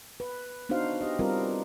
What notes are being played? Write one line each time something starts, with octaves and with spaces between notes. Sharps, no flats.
B4
B3 D4 D#4 F#4 C5 F5
G4 D#5
G3 C4 F4 A#4 B4